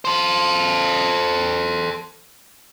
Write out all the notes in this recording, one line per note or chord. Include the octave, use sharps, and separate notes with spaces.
A4 C5